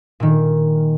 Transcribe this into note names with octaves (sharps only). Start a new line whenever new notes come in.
A#2 D#3